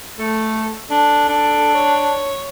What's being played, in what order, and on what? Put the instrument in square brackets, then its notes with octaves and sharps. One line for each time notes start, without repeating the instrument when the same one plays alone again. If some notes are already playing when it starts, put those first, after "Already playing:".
[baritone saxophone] A3 [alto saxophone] A4
[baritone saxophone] D4 [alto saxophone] A4
[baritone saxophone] D4
[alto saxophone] C#5